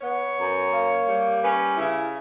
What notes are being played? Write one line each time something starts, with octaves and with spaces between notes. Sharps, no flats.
B3 C#5
F#2
A#3
G3
C#4 B4
C#3 E4